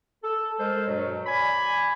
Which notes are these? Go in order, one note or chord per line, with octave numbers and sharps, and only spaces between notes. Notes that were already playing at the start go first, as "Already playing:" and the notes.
A4
G#3 A4 A#4 C5
G2 B2 F#3
D5 G#5 B5